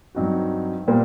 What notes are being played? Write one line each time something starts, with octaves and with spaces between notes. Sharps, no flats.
G2 F#3 C4 D#4 F#4
A#2 G3 A#3